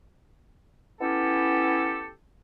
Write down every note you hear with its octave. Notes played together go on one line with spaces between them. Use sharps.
B3 C#4 E4 G4 A4